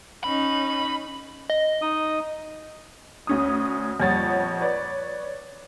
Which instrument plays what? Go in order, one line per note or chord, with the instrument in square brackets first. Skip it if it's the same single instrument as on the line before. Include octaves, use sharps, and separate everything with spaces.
[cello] C#4 D#4 [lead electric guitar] B5
[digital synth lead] D#5
[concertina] D#4 D#6
[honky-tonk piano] D2 C#4 D#6
F2 A#2 G3 C#5 F#5 A6
B4 C#5 D5